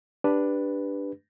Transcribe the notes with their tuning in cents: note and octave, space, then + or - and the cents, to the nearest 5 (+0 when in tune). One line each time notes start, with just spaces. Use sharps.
D4 +0 G4 +5 B4 +0